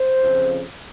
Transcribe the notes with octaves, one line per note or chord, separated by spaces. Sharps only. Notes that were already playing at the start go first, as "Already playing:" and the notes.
Already playing: C5
F2 C#3 F3